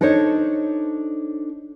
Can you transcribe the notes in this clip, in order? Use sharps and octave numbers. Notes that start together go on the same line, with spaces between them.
D4 D#4 A4 C5 C#5